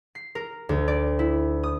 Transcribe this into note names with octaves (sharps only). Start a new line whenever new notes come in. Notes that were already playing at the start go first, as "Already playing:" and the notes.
C7
A#4
D2
D5
E4
D#6